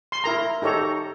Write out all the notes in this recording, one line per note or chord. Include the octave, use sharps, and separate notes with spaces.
C6
E4 A#4 A#5
D#4 G4 A4 C#5 A#5